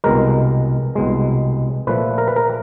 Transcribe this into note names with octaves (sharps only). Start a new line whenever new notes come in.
C2 B2 G#3 A#4
C2 B2 G#3
A#2 F3 A3 B4
A#4
B4
A#4